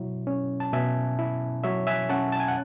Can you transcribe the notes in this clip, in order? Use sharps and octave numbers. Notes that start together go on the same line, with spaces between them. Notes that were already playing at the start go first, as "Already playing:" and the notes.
Already playing: B2 F#3 E4
C#4
A5
B2 E5 G#5
E4
F#3 C#5 E5
E5 G#5
C#4 F#5 A5
A5
G#5
F#5